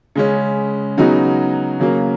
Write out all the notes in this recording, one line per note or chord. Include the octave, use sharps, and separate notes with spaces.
C#3 G#3 C#4
C#3 F#3 B3 D#4 F#4
C#3 F#3 A#3